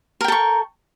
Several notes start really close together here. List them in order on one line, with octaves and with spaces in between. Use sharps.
A#4 G5 A4 C#6